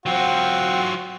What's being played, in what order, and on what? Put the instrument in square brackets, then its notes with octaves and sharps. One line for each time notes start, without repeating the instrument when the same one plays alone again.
[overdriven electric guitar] F#3 F4 [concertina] C4 G5 [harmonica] F#4